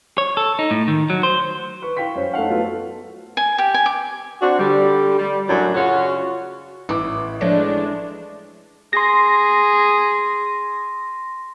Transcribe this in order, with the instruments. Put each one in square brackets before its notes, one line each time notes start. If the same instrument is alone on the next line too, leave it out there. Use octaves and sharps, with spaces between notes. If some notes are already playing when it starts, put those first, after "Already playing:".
[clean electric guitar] C#5
A4
D#4
A2
D#3
F#3
C5
[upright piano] B4 C#6
E4 F5 G5 C#6 B6
F#2 C#4 C5
A3 D#4 F5 F#5
F#3 A3 B3 E4 F4
[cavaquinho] G#5
G4
G#5
D6
[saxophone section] C4 D4 F#4
D3 G3
G3
F#2 A2 F#3 D4 F#4
C#3 C#4 F4 F#4
[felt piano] A1 D6 [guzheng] E3
[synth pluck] F3 C#5 A#6 [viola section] G#3 D4 [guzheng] A3
[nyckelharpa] G#4 [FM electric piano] C6 A#6